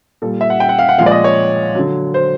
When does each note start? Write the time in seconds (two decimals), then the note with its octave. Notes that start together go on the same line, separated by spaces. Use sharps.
0.22 A#2 G3 A4
0.41 E5
0.50 F#5
0.60 G5
0.69 F#5
0.79 F5
0.89 F#5
0.98 A#2 F3 G#3 F5
1.06 D5
1.11 D#5
1.24 C#5
1.75 D3 F#3
2.14 C5